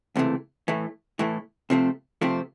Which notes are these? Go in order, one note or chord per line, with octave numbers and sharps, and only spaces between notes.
C#2 C3 E3 A3
A2 E3 A3
A2 E3 A3
C3 F3 A3 C4
C3 F3 A3 C4